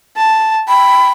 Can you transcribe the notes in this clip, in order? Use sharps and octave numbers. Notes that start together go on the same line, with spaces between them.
A5
G5 B5